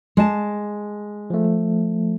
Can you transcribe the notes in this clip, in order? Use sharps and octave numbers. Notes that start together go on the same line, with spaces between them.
G#3 A5
F3 A3